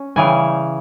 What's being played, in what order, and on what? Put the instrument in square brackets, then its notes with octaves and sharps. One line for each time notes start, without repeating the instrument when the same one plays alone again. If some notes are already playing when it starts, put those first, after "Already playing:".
Already playing: [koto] C#4
C#3 E3 G3 G#5